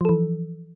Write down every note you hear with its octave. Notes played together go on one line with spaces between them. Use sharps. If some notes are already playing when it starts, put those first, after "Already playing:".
E3 F3 A4